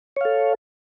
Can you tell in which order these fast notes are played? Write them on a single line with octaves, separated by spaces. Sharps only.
C#5 F5 A4